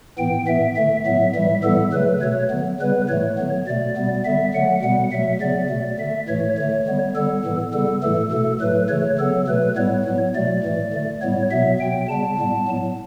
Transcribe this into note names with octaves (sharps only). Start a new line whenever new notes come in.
A2 E3 B3 G5
A2 E3 B3 E5
D3 A3 E5
A2 F#3 B3 E5
A2 E3 G3 E5
A2 E3 G3 B3 A4
C#3 F#3 A3 B4
B2 A3 C#5
D3 F#3 B3
C#3 G3 B3 B4
A2 E3 A3 C#5
D3 F#3 B3
B2 A3 D5
B2 G3 B3
D3 G3 B3 E5
D3 F#3 A3 F#5
B2 G3 B3 F#5
B2 F#3 A3 E5
C#3 F#3 B3 D5
B2 A3
D3 A3 E5
A2 E3 A3 C#5
D3 A3 C#5
D3 G3 B3
D3 G3 B3 A4
A2 E3 B3
C#3 G3 B3 A4
A2 E3 A3 A4
B2 A3 A4
A2 F#3 A3 B4
C#3 E3 A3 C#5
C#3 F#3 B3 A4
B2 F#3 A3 B4
A2 G3 B3 C#5
A2 F#3 B3
B2 F#3 A3 D5
A2 E3 A3
D3 A3
A2 G3 B3 C#5
B2 F#3 B3 E5
B2 F#3 B3 G5
C#3 G3 B3 A5
A2 G3 B3
A2 F#3 B3